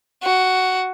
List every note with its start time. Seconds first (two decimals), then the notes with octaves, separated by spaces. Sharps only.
0.23 F#4